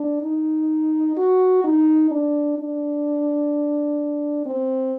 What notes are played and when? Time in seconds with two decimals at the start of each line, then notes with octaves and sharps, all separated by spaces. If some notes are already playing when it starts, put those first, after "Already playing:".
Already playing: D4
0.22 D#4
1.17 F#4
1.64 D#4
2.11 D4
2.58 D4
4.46 C4